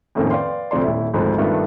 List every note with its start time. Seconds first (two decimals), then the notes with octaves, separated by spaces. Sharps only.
0.15 F2 A2 D#3 F3 A#3 C#4
0.30 B4 D5 F5 G5 C6
0.71 D2 C3 F3 D5 C6
0.84 D#1 E4
1.14 G#1 D2 G#2 F3
1.38 G2 D#3 A3 B3 D4 F4